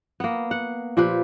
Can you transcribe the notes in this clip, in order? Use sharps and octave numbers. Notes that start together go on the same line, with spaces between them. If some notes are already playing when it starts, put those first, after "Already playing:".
A#3 B3
F#5
A#2 F3 G4 B4